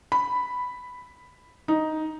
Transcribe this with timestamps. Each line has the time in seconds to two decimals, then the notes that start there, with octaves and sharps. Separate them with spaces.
0.12 B5
1.68 D#4